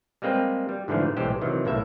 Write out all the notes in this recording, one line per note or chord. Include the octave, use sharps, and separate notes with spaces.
G3 G#3 A#3 C4 B4
G3
G#2 D3 E3 F3 A3
B1 A2 E3 G#3 G4 C5
C3 D#3 E3 F#3
B1 A2 A#3 E5